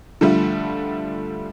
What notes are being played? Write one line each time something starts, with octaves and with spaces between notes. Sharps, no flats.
D3 F3 G3 A3